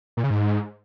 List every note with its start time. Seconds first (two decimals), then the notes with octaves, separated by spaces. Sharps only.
0.17 A#2
0.24 C#3
0.30 G#2